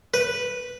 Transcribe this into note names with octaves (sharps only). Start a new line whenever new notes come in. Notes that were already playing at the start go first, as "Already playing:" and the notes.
B4